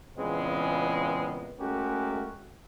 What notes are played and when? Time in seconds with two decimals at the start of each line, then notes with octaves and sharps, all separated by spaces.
0.17 A#2 C#3 E3 G#3 B3 C4
1.60 G#3 A3 C#4 F#4 G4 A#4